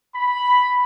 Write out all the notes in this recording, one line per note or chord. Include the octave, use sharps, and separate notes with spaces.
B5